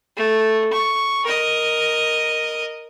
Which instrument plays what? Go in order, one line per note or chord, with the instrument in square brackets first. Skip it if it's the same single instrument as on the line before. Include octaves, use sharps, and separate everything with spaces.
[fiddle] A3
C#6
A#4 D#5